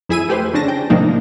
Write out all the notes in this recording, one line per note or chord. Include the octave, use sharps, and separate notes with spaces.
F2 E4 G#4 G#5 E6 D#7
A3 G4 B4 C5
F2 C#3 C#4 D4 A5 A#6
G5
A2 C3 F3 A#3 D4 D#4